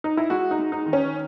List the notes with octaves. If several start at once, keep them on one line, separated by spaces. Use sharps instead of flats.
D#4
E4
G#3 F#4
D#4
G#3
D#4
D#3
C#4